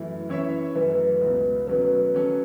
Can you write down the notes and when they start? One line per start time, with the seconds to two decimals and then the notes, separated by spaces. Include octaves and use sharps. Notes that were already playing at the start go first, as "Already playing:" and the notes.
Already playing: F#2 E3 A3 E4
0.29 E3 C#4 E4 C#5 E5
0.76 F#2 E3 A3 B4
1.21 C#2 B2 B3
1.67 B2 F#3 A3 C#4 B4
2.14 F#3 C#4 A4